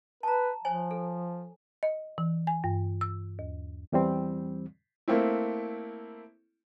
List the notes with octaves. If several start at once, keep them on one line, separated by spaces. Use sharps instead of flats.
B4 A5 A#5
F3 C5 C#5 G#5
A4
D#5
E3
G#5
G2
E6
D#2
E2 E3 G3 C4
A3 A#3 C4 E4